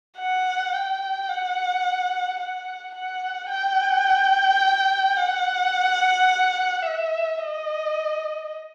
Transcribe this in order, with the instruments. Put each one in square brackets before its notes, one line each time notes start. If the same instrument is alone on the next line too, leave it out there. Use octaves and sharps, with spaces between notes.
[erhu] F#5
G5
F#5
F#5
F#5
G5
F#5
E5
D#5